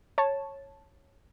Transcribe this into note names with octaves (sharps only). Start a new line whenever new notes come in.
C#5 A5